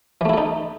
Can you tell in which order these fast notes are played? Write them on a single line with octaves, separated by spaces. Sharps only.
E3 A3 E4 A4 D#4